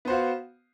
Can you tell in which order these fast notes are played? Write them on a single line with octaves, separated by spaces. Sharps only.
B3 C5 F#4 F5